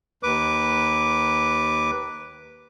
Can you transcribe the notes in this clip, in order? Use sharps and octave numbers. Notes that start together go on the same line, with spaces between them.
D#2 B4 D6